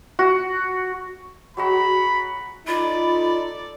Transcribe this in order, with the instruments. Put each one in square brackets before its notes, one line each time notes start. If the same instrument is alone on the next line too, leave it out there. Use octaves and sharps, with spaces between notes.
[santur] F#4
[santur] F#3 G#3 F#4 [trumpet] B5
[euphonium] D#4 [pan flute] F4 [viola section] A4 D5 [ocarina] B5